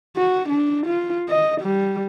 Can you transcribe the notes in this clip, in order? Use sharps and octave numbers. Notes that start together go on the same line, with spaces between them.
F#4
D4
F4
D#5
G3